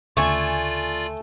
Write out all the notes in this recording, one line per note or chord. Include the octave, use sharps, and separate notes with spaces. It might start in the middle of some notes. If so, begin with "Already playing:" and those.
D2 C#3 A3 F4 D5 G#5 C#6